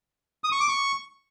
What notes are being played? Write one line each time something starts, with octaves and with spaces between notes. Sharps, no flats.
D#6
C#6
D6
C#6